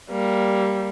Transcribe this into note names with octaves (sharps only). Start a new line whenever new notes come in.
G3 A#3